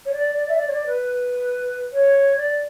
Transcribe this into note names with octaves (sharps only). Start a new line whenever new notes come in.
C#5
D5
D5
E5
D5
C#5
D5
B4
C#5
D5